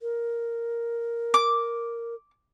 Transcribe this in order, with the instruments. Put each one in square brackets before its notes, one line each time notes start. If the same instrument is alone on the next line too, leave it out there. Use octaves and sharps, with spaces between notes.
[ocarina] A#4
[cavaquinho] D6